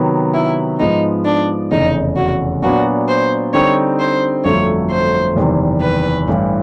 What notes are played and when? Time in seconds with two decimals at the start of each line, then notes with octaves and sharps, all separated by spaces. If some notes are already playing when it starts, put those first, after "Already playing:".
Already playing: C3 D#3 F#3 B3
0.34 E4
0.79 G#2 F3 G#3 B3 D#4
1.25 D4
1.71 F1 E2 C#3 D#4
2.17 F#4
2.62 A#2 F#3 B3 D4 F#4
3.08 C5
3.54 D3 G3 C4 D#4 C#5
3.99 C5
4.44 G1 F2 D3 F#3 A3 C#5
4.90 C5
5.35 F#1 E2 C3 D#3 G3
5.81 B4
6.28 A1 G2 E3